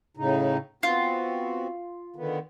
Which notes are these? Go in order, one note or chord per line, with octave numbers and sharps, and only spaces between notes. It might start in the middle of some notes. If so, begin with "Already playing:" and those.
A2 C#3 D#4
B3 C4 F4 F#4
D3 D#3 B3